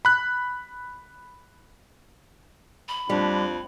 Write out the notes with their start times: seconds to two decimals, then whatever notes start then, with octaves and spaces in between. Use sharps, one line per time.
0.05 B5 F#6
2.88 B5
3.09 F2 G3 D4